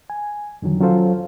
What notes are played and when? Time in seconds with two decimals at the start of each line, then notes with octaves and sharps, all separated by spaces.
0.10 G#5
0.62 F2 D3 D#3 F#3
0.80 F#3 C#4 F4 A4 C5 F5